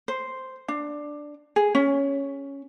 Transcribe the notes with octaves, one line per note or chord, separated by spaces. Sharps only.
C5
D4
G#4
C#4